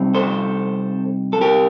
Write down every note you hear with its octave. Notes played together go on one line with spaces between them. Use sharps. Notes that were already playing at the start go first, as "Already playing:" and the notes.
Already playing: C3 G3 C4 D#4
A4 C5
A4
G4 A#4